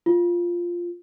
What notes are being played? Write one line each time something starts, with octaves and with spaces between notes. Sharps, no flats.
F4